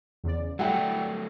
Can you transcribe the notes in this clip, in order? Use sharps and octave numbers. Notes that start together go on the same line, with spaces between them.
E2 C#3 D5
F#3 G3 A3 E4 F#5 G5